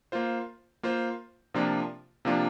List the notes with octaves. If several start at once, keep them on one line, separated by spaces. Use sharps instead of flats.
A#3 F4 C5
A#3 F4 C5
C3 F3 A#3 D4 F4
C3 F3 A#3 D4 F4